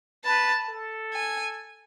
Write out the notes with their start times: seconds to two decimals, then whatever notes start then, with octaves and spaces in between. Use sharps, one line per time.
0.24 B4 A5
0.69 A4
1.13 G#5